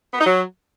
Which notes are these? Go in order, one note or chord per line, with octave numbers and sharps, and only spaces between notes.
B3
D#4
F#3